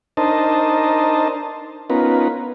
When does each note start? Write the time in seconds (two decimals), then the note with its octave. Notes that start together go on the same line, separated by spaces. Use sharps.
0.17 D4 D#4 A#4 C5 D#5 A5
1.90 B3 C#4 D#4 F4 A#4 B4